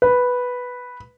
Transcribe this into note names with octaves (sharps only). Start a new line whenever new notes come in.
B4